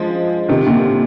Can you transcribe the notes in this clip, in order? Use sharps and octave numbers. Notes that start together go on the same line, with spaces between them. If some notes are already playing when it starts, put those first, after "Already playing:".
Already playing: F3 G#3
C3 D#3
A#2 D3